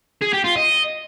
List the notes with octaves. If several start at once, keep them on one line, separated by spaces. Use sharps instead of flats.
G#4
G4
F4
D#5